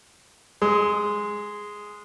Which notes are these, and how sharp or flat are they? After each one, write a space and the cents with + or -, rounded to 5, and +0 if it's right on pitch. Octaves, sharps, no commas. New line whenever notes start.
G#3 +0 D#6 +40